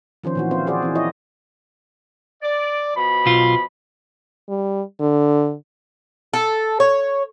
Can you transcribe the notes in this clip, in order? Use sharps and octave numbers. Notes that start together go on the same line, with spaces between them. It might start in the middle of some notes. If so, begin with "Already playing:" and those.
D#3 F3 C#4 C5
A#2 E3 F#4
C4 E4 F4 C5
F#4 G#4 C5 D5
E3 C4
E4 F4 C#5 D#5
D5
B2 F3 B5
B1 F4
G3
D3
A4
C#5